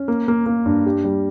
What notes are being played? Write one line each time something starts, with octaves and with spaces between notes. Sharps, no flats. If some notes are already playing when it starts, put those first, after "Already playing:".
Already playing: C#4
A#3
A#3
A#3
G2
G4
G3